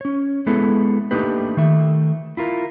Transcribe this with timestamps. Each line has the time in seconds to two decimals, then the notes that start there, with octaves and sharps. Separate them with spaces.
0.01 C#4 C#5
0.47 G#3 B3 E4 G#4 A4
1.11 A3 A#3 D4 D#4 G4 B4
1.57 D#3 A3 E5
2.37 E4 F4 A#4